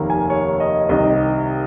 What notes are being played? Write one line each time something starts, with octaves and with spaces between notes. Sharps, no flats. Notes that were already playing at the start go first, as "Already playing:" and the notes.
Already playing: F1 D#2 D#3 A#3
G#5
C#5
D#5
C2 C3 D#3 D#5